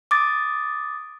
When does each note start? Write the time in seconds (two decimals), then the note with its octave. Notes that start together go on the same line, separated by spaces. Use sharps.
0.11 D6 D#6 A6